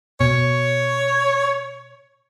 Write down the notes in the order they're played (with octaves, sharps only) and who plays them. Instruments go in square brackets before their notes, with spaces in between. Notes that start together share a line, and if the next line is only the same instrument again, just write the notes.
[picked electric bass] B2 [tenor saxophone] C#5